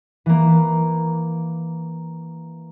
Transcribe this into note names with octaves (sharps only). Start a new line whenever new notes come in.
E3 A#3